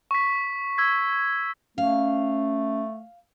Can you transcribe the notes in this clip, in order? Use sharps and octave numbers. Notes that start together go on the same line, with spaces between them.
C#6 B6
E6 G#6 B6
A3 C#4 F5